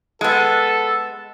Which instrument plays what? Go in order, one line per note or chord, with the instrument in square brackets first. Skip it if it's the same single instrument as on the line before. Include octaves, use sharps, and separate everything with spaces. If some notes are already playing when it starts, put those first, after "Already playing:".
[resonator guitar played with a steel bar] G#3 B3 [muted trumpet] A4